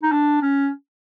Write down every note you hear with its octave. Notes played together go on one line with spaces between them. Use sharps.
D#4
D4
C#4